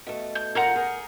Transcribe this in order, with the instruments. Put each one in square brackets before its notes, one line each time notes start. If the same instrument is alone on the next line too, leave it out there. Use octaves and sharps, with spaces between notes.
[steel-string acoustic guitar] B2 A3
[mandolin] G6
[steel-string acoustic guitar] D#2 F4 A#4 [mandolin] F#5 A#5 G6
[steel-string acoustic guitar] G#4 A#4